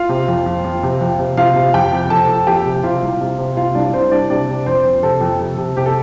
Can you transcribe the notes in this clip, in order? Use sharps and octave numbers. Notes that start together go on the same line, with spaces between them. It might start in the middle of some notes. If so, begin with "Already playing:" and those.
Already playing: F4 F5
C3
F2
F2
F2
C3
F2
C3
C3 F4 F5
C3
F2 G4 G5
C3
F2 A4 A5
F2
F2 G4 G5
C3
C3 F4 F5
C2
C3
C3
C3 F4 F5
C2 D4 D5
C2 C4 C5
C2 D4 D5
C3 D4 D5
C3
F2 C4 C5
F2
C3 A4
F2
C3
C3
C3 G4
A4